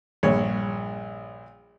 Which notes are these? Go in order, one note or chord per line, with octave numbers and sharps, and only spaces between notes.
A#1 G2 C#5